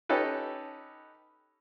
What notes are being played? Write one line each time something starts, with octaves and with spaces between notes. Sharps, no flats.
C#4 D#4 G4 A4 B4